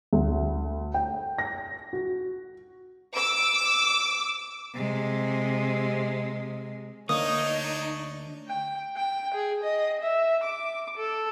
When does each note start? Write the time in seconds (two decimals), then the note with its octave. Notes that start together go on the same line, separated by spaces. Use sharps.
0.13 D2
0.94 G5
1.39 A#6
1.93 F#4
3.13 D6 E6
4.74 C3 G#3
7.09 D2 A#3 D4 D#4 C#5 D#6
8.48 G5
8.97 G5
9.34 G#4
9.64 D#5
10.01 E5
10.44 D6
10.98 A4